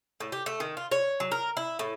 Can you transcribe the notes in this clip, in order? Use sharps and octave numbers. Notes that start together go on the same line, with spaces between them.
A2
G4
A3
D#3
F4
C#5
F#3
A#4
E4
A2